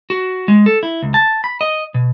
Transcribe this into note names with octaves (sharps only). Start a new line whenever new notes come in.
F#4
G#3
A4
E4
C#2
A5
B5
D#5
B2